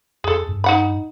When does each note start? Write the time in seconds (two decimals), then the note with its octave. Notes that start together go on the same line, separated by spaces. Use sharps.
0.24 F2 G#4 A4
0.49 G2
0.64 D#4 F#5 B5